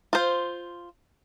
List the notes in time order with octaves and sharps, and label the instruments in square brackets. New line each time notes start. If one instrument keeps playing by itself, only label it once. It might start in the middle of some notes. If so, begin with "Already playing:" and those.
[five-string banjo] F4 C5